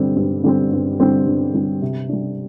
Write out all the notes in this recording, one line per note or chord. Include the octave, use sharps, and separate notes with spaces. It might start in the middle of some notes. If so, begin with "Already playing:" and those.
Already playing: G2 D3 G3 C4
G2
D3 G3 C4
G2
D3 G3 C4
G2
D3 G3 C4
C3
G3 D4